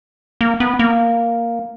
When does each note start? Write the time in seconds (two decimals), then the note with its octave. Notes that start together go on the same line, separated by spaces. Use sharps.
0.41 A#3
0.60 B3
0.79 A#3